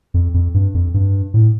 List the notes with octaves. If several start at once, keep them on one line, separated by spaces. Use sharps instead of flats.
F2
F2
G2
F2
G2
A2